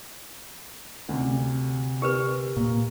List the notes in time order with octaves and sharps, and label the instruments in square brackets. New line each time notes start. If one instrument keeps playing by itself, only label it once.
[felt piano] D2 C3
[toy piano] G4 A#4 B4
[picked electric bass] A#2